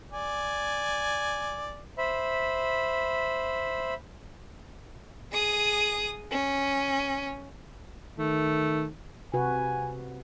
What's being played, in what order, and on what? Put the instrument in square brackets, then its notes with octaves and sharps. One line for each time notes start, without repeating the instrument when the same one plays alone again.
[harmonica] D5 G#5
[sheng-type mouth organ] C5 E5 B5
[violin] G#4 D#6
C#4
[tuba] D#3 [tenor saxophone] A3
[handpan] C3 F#4 B4 [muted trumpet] G#5